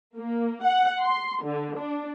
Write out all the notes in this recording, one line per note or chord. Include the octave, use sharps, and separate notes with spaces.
A#3
F#5
C6
D3
D4